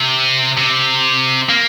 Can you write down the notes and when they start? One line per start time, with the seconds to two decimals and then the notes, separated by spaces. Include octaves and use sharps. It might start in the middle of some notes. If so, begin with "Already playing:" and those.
Already playing: C3
0.57 C3
1.49 A#3